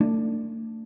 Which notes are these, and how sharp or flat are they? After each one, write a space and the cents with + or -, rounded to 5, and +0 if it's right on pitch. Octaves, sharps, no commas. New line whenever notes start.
A3 +35 D4 +0